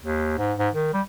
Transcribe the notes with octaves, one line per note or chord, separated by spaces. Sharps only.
D#2
G#2
G#2
D#3
G3